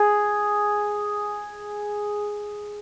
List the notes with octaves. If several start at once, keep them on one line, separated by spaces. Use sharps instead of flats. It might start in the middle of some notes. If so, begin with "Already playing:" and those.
Already playing: G#4